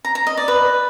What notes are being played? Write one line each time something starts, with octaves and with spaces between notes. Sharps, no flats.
A#5
A#5
D#5
D5
B4